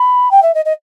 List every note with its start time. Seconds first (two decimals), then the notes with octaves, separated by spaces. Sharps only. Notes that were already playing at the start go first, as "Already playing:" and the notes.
Already playing: B5
0.31 G5
0.42 E5
0.54 D#5
0.65 D#5